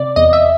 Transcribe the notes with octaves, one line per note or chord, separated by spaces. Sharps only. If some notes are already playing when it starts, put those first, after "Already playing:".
Already playing: C3 D5
E2 D#5
E5